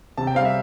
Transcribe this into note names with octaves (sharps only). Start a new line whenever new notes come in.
C3 A5
G5
G3 C4 F5
E5